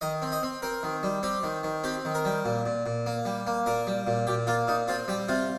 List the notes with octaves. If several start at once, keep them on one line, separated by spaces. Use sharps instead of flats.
D#3 D#5
C4
D#5
C4
C4 A#4
D#3
G3
C4 G4
D#3
D#3
C4 G4
D#3
A#4
G3
A#2
A#2
A#2
A#3
G3
A#3
A#2 A#4
G3
A#2
A#2 G4
A#3 F4
A#2 D#4
C4 F4
G3 G4
C3 F4